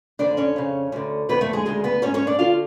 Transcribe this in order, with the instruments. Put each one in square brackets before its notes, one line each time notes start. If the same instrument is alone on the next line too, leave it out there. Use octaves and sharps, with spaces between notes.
[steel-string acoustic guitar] F2 D3 D4 D5
C#4 C#5
F2 C#3
D2 D3
F2 D3 B3 B4
A3 A4
G#3 G#4
D2 C#3 G#3 G#4
B3 B4
G#2 C#4 C#5
C#4 C#5
D4 D5
D3 F4 F5